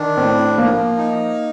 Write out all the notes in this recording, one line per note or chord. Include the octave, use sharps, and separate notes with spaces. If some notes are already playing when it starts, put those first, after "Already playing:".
Already playing: D#3 D4
A2 C4
F3 A#3
D#4